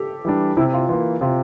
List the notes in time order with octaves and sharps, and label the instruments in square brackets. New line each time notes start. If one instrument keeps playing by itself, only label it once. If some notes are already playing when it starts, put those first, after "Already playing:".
Already playing: [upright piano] G4 A4
[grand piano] E3 G3 D4
[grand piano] C3 [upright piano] E4
[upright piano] F4
[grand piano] E3 A#3 [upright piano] F4
[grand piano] C3 [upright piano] F4